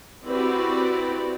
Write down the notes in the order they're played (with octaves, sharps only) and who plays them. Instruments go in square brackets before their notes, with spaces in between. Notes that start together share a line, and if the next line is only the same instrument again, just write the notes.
[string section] C4 E4 F#4 G4 B4 D5